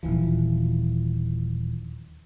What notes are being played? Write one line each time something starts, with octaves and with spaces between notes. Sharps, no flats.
D#1 B1 E3 F3